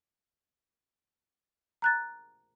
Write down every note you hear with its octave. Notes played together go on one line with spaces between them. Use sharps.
A#5 F#6 A6